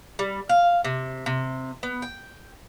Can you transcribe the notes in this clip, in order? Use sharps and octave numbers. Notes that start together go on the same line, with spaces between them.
G3
F5
C3
C3
B3
G5